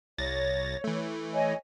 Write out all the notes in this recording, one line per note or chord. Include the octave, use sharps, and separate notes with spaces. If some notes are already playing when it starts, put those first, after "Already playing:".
C2 C#5 A6 A#6
E3 A3
C#5 D#5 G#5